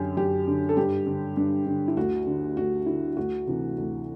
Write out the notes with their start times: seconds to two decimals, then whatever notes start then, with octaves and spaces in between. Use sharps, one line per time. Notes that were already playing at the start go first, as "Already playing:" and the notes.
Already playing: F#2 D3 G4
0.17 F#2 G4
0.47 D3
0.69 A4
0.77 G2 G4
1.07 D3
1.37 G2
1.66 D3
1.88 E4
1.96 D2 F#4
2.27 D3
2.57 D2 F#4
2.86 D3 E4
3.17 D2 F#4
3.47 C3 E3
3.78 D2